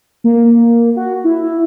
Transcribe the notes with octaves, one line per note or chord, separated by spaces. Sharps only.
A#3
F#4
E4